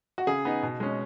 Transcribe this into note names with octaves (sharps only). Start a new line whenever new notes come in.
F#4
C#3 G#4
B3 D#4
B2
G#3 C#4